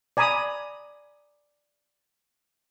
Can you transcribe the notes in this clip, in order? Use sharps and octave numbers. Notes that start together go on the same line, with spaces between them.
D5 G#5 A#5 B5 D#6